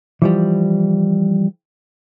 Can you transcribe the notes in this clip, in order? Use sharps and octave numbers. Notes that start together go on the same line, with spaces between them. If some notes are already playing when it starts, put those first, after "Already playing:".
E3 F3 G3